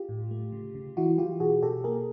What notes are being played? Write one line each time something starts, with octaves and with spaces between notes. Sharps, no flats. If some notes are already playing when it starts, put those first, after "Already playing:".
Already playing: F4 G4
A2
A3
C#3
C#3
E3 E4 F#4
E3 F4 G4
B2 F#4 G#4
B2 G4 A4
A#3 G#4 A#4